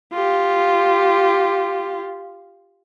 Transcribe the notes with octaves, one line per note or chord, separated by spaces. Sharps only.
F4 G4